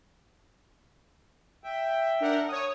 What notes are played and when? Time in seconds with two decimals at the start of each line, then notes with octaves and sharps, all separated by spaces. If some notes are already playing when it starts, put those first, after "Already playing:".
1.64 E5 G5
2.20 D4 A#4 F#5
2.48 C#5 D#6